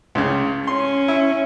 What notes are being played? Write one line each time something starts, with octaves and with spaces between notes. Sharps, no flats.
C#2 C#3
C#4 C6
E4